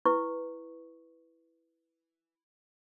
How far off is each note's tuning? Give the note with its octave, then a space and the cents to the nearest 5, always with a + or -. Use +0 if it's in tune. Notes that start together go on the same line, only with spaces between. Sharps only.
E4 +0 B4 +0 C#6 -5